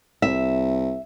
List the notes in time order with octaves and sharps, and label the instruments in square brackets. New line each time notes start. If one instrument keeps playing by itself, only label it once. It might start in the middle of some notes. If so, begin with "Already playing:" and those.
[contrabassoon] C2 [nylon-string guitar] E5